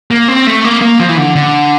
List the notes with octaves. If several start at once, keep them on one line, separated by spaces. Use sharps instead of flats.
A#3
C4
A3
A#3
A#3
F3
E3
D3
D3